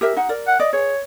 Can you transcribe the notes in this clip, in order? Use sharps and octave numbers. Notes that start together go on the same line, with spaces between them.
G4 A#4 E5
D#4 F#5
A#4 D5
F#5
D5 D#5
G#4 C#5